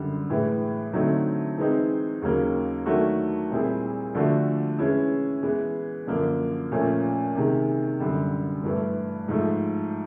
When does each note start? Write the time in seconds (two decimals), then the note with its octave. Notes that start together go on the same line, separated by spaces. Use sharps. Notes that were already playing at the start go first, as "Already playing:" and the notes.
Already playing: F#2 D3 G3
0.30 A2 E3 G#3
0.93 D3 F#3 A3 C4 D#4
1.58 E3 G#3 C4 D#4
2.22 D#2 C#3 F#3 A#3
2.86 D#3 F#3 A3 D4 F#4
3.51 A#2 G3 C4 E4 G#4
4.15 D3 F3 A3 D4 F#4
4.79 E3 G#3 C#4 E4
5.43 E3 G#3 B3
6.07 F#2 D3 F3 A#3 D4
6.72 A#2 F3 A3 C#4
7.35 C3 D#3 G#3
8.00 F#2 D3 G3
8.64 G2 E3 A3
9.28 G#2 F3 A3